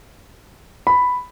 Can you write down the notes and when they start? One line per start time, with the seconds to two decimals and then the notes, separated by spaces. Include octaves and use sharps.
0.87 B5